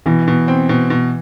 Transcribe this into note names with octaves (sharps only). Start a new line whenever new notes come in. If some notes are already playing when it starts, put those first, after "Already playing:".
B2 E3
B2
C4
B2
B2